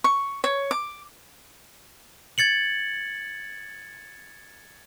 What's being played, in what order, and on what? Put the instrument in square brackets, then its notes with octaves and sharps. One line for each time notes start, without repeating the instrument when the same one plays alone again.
[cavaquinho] C#6
C#5
D6
[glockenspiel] G#6 A6 C#7 F#7